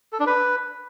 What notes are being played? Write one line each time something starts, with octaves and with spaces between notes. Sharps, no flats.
A4
D4
B4